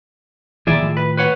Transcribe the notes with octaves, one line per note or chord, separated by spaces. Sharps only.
A#2 D#3 E3 G#4 D5 E5
A2 D#3 F3
B4
B4 C#5 F#5